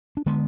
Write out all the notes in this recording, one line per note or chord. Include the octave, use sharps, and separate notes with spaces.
D4
D3 G#3 B3